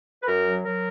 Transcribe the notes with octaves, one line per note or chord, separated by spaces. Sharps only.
B4
F#2 A#4
F#3
F#3 A#4